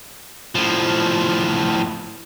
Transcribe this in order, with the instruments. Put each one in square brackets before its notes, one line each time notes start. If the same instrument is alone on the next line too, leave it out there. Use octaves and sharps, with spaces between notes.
[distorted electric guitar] A2 F3